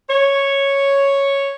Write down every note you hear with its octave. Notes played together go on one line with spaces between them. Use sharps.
C#5